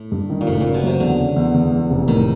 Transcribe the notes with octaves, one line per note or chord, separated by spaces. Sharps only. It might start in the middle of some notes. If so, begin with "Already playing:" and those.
Already playing: A2
G2
D#3
A#2
F#1 A2
F#1 A#2
B2
C3 F#3
E2 D3
C#3
E2
E2
E2
F1
A2 D#3